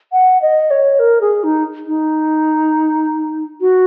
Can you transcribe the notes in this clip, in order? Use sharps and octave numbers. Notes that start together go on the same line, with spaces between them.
F#5
D#5
C#5
A#4
G#4
D#4
D#4
F#4